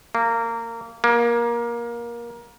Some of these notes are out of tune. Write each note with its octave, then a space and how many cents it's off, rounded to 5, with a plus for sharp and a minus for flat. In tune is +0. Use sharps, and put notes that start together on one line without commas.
A#3 -20
A#3 +20